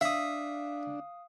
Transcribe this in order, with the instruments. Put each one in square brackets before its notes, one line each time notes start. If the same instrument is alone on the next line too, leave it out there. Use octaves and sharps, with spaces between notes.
[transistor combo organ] D4 [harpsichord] E5 [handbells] F5 D#6